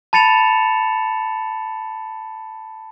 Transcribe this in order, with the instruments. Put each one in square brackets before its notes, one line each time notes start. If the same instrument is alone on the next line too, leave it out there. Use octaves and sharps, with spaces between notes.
[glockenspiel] A5 B5 A6 C#7 E7 F7